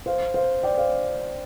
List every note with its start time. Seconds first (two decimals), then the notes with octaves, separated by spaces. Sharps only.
0.06 C5 F5
0.34 C5 F5
0.63 D5 G5
0.78 C5 F5